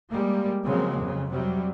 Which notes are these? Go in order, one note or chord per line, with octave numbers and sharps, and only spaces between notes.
G3 G#3 A#3
C#3 F3 F#3 G#3 A#3 C4
F2 C#3
C3 F#3 G3